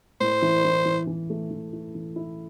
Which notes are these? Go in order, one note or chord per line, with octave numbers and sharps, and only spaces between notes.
A2 C5
E3
E3
E3
E3
A3
E3
E4
E3
E4